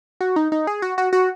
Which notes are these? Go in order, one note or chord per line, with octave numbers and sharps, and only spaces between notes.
F#4
D#4
D#4
G#4
F#4
F#4
F#4